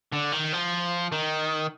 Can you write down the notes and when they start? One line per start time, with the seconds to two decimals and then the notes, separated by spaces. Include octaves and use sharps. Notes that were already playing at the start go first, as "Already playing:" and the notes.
0.13 D3
0.32 D#3
0.53 F3
1.12 D#3